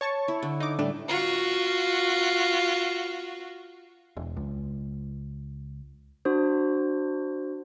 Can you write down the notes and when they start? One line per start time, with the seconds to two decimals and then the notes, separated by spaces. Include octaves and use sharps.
0.01 C#5 A5 C#6
0.28 E4
0.43 D3
0.60 D#4 D6
0.79 A2 G3 A3 D4
1.09 F4 F#4
4.17 E1
4.37 C#2
6.25 D4 F#4 C5